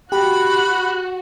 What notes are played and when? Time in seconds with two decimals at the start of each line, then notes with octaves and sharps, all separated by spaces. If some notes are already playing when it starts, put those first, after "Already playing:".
0.12 F#4 G4 B5 F#6